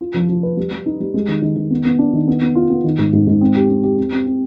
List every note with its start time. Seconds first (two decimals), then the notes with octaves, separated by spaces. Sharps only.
0.01 F4
0.14 F3
0.29 F3
0.43 B4
0.57 G3
0.71 G3
0.86 D#4
1.00 G3
1.14 G#3
1.28 D#3
1.42 D#3
1.56 D#3
1.70 B3
1.85 B3
1.99 D4
2.13 D#3
2.28 B3
2.41 B3
2.55 F4
2.70 B3
2.84 D#3
2.99 G#2
3.13 G#2
3.27 G#2
3.41 C4
3.55 G4
3.69 C4
3.83 G4
3.98 C4
4.12 C4
4.26 C4